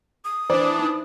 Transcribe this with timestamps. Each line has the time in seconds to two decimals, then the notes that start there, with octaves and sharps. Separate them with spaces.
0.25 D#6
0.50 E3 D4 C5 D5
0.79 D#4